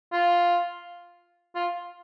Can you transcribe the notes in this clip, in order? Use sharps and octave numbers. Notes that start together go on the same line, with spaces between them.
F4
F4